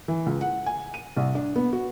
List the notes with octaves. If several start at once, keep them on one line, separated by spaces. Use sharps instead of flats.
E3
C#2
F#5
G#5
D#7
C2
D4
B3
F#4